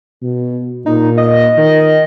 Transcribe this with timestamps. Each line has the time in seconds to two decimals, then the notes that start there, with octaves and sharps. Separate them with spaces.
0.23 B2
0.86 A#2 D#4
1.17 D#5
1.58 D#3